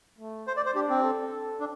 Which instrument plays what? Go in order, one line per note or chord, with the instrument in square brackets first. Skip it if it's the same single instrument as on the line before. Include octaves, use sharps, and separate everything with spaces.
[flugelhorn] A3
[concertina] C5
D5
C5
[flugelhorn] D4 [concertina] G4
[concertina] C4
[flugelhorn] A4
[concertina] D4